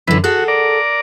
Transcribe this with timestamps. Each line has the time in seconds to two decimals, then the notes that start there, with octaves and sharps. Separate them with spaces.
0.07 F#2 D3 E3 B4
0.24 F#4 G#4 A4 F#5
0.48 A#4 D5